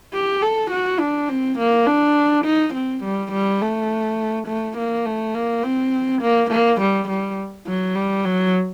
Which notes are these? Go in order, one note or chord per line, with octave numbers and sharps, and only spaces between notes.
G4
A4
F#4
D4
C4
A#3
D4
D#4
C4
G3
G3
A3
A3
A#3
A3
A#3
C4
A#3
A#3
G3
G3
F#3
G3
F#3